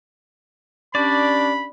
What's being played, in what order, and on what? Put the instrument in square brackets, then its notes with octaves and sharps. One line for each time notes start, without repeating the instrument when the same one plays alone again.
[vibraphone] C#4 G4 [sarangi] D4 [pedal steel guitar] D5 [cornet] B5